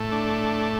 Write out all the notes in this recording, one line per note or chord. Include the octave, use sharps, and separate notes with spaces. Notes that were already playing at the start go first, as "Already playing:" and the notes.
Already playing: A2 A3
D4